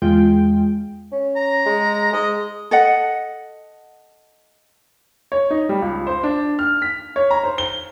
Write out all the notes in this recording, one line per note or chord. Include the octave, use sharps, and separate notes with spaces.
E2 G#3 F4 G5
C#4
A#5
G#3
G#3 D#5
A4 D#5 F#5
C#5
D#4
G3
C#2
C5
D4
F6
B6
C#5
A#5
C5
G7